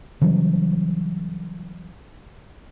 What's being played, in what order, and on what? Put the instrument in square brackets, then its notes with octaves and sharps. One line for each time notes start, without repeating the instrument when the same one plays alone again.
[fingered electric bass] C#3 E3 F#3 G3